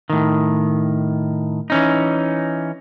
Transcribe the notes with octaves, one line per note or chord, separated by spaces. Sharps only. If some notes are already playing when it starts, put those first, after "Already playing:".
A2 D#3
E3 C#4 D#4